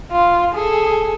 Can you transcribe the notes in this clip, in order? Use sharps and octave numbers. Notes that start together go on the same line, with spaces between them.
F4
G#4 A4